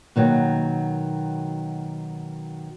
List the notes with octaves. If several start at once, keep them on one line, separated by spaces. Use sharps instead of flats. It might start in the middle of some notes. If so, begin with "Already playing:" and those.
B2 D#3 F#3 G3 A#3